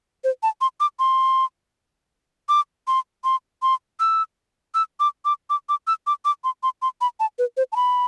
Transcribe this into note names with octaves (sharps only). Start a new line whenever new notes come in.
C5
A5
C6
D6
C6
D6
C6
C6
C6
E6
E6
D6
D6
D6
D6
E6
D6
D6
C6
C6
C6
B5
A5
B4
C5
A5
B5